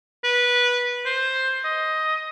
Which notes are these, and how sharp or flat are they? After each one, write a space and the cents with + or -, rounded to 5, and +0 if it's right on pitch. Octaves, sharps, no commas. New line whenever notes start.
B4 -15
C5 +10
D#5 +10